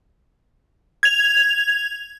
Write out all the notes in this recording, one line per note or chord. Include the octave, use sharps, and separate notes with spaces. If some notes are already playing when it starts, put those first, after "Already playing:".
G#6 F7